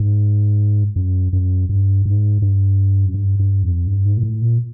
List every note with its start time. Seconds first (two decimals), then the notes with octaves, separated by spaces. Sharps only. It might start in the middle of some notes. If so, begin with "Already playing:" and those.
Already playing: G#2
0.96 F#2
1.33 F#2
1.69 G2
2.05 G#2
2.42 G2
3.06 F#2
3.14 G2
3.39 G2
3.63 F2
3.87 G2
4.05 G#2
4.17 A#2
4.23 A2
4.42 A#2